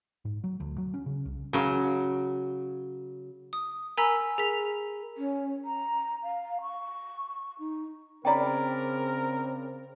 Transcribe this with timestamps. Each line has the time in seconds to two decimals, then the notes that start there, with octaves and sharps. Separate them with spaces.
0.25 G#2
0.44 F#3
0.60 D2
0.78 F#3
0.94 C#4
1.06 C#3
1.25 C2
1.53 C#3 F#3
3.53 D#6
3.97 A#4 G#5 A#5 B5 E6 B6
4.38 G#4 A#4 B6 F7
5.17 C#4
5.65 A#5
6.23 F5
6.61 C#6
7.59 D#4
8.25 C#3 C4 C#4 A#4 D5 G5 A#5 B5